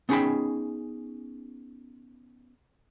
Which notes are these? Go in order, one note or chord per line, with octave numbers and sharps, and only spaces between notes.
B3 C#4 D#4 G#4 G5 B5